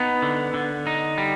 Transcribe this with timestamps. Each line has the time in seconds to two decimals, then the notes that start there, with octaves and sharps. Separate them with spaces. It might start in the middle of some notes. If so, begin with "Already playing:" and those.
Already playing: B3 D#4
0.22 D3
0.54 D3
0.87 D#4
1.18 G3